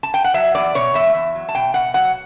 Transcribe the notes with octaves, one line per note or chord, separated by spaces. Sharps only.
A5
G5
F#5
F#3 E5
E2 D5
B2 C#5
E2 E5
E2
F#3
A5
B2 G5
B2 F#5
F#3 F#5